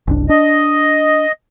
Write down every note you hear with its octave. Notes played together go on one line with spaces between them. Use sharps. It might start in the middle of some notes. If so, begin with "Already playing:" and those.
F#1 C2 D4
D4 D#5